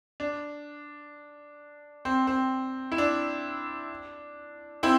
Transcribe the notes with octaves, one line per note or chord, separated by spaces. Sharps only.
D4
C4
C4
E4
D4
C4 E4